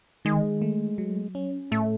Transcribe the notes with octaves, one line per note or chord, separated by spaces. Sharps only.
D#3 G#3
A3
F#3
C#4
A2 A3